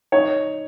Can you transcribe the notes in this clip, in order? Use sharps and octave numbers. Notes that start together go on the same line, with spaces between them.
D#4 C#5